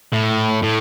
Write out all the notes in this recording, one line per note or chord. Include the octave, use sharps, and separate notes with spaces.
A2
A2